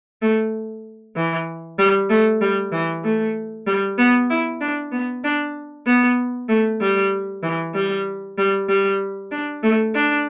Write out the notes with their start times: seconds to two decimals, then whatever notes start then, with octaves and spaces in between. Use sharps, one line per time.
0.22 A3
1.16 E3
1.79 G3
2.10 A3
2.41 G3
2.72 E3
3.04 A3
3.67 G3
3.98 B3
4.30 E4
4.61 D4
4.92 B3
5.24 D4
5.87 B3
6.49 A3
6.81 G3
7.43 E3
7.74 G3
8.38 G3
8.69 G3
9.31 D4
9.63 A3
9.95 D4